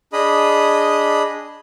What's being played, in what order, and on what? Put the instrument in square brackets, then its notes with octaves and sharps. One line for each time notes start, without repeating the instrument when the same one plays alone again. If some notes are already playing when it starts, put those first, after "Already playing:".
[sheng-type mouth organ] D4 G#4 D#5 B5 D#6